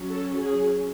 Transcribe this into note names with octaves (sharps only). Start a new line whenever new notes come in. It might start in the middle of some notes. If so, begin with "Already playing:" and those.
Already playing: F#3 C#4
A4
G#4